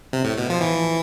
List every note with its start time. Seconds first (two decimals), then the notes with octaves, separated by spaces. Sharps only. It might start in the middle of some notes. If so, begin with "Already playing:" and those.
0.13 C3
0.25 A2
0.38 B2
0.50 F3
0.61 E3